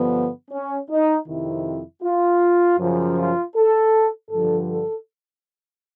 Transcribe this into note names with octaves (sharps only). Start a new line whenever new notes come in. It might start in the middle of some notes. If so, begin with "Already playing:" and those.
Already playing: G2 D3 F3 B3
C#4
D#4
F2 C3 D#3 E4
F4
F#2 C#3 F3
F4
A4
G2 D3 F3 A4
A4